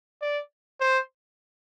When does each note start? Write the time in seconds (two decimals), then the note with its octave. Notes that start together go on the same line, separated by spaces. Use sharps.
0.22 D5
0.81 C5